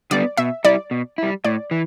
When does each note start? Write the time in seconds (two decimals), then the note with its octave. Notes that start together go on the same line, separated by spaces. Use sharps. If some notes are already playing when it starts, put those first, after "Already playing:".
0.11 D3 G3 B3 D5
0.37 B2 E5
0.64 G3 E4 D5
0.91 B2
1.18 G3 E4
1.45 A2 D5
1.71 E3